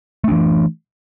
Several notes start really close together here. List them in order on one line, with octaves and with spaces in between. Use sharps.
A3 D4 E3